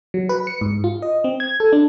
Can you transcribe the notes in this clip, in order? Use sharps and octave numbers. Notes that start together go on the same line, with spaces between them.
F#3
B4
C#7
G#2
F4
D#5
C4
G#6
A4
D4